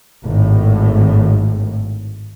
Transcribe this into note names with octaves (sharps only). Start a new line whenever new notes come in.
G#1 A2